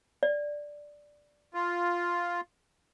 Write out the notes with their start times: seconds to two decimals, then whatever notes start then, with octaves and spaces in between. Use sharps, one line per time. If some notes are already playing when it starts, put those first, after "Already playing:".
0.23 D5
1.54 F4